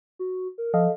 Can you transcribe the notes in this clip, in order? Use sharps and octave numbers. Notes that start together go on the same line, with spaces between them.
F#4
A#4
F3 A4 D#5 F5